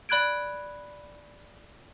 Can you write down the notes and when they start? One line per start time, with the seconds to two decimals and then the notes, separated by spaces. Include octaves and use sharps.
0.09 D5 B5 F#6 G#6 D7